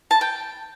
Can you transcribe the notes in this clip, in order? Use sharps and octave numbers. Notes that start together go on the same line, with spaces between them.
A5
G5